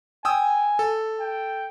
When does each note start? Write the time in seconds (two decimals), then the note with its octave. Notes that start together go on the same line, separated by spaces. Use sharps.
0.25 G5 G#5 D#6 E6
0.79 A4
1.20 G5